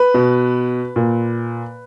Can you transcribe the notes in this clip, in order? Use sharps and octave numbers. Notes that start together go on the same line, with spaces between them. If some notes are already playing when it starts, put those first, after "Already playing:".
Already playing: B4
B2
A#2